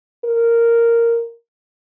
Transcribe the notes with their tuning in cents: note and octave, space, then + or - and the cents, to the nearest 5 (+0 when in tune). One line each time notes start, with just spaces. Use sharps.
A#4 -5